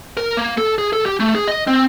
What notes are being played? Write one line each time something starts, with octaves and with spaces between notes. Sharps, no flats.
A#4
A#3
A4
G#4
A4
G4
A3
G#4
D#5
C4